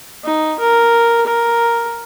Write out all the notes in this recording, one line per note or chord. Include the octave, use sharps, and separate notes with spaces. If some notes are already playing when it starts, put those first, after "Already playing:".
D#4
A#4
A#4